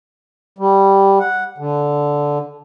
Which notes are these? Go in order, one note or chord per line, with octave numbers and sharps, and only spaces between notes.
G3
F#5
D3